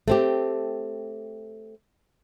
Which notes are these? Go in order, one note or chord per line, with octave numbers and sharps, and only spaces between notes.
A3 C4 G4